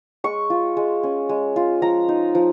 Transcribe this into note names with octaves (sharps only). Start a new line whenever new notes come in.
G#3 C#6
F4
G#3
C#4
G#3
F4
F3 A#5
D#4
F3